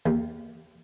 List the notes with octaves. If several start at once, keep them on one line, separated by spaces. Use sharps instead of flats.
D#2